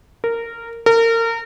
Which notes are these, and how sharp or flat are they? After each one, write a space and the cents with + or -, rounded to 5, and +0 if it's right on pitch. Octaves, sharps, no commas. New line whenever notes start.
A#4 -15
A#4 -30